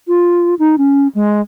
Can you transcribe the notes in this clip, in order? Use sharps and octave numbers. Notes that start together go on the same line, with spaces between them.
F4
D#4
C#4
G#3